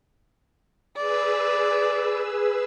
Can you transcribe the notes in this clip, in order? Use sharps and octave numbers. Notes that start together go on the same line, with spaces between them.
G#4 B4 D5 E6